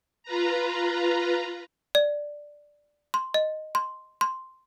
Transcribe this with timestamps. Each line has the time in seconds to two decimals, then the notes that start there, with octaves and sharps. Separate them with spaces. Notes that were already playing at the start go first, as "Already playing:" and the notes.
0.23 F4 B4 A#5
1.95 D5
3.14 C6
3.34 D#5
3.75 C6
4.21 C6